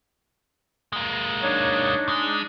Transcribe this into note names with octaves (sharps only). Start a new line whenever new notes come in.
G#3 A#3
D4 D#4 C#5
G#3